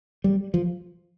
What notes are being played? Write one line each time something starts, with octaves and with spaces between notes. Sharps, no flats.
G3
F3